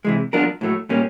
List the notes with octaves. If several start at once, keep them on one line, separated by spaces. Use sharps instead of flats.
C3 E3 G#3
F#3 B3 D4 F4 A#4
A2 F#3 A3
A#2 G3 A#3 C#4